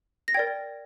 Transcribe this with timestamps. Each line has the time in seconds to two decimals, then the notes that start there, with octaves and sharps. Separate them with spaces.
0.28 A#6
0.34 A#4 D5 G5 G#6